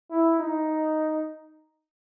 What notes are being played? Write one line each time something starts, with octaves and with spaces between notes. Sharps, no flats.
E4
D#4